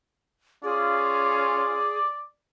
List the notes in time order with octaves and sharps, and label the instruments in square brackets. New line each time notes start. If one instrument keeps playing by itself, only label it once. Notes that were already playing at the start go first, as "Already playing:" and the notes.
[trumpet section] C#4 F4 [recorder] G#4 [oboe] D5
[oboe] D5